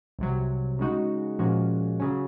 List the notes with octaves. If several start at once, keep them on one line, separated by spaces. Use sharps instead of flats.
C2 C3 F#3
C#3 G#3 D#4 F#4
A#2 F3 G#3 C#4 F#4
C#3 F#3 C#4